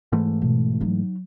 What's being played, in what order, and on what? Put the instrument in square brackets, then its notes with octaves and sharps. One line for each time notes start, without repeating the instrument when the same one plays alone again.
[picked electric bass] G#2 E3 A3
[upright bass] B2
F#3 D#4